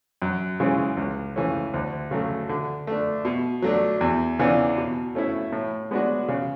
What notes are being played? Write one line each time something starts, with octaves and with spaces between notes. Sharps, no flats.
F#2
C#3 E3 G#3 C#4
C#2
C#3 E3 A3 C#4
D2
C#3 F#3 A3
D3
A3 D4
B2
F#3 A3 D4
E2
C#3 E3 B3 D4
B2
A3 C#4 E4
A2
G#3 B3 D4 F#4
C#3